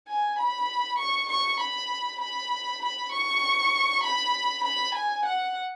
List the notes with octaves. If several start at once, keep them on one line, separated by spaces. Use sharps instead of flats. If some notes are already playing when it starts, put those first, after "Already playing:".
G#5
B5
C#6
C#6
B5
B5
B5
C#6
B5
B5
G#5
F#5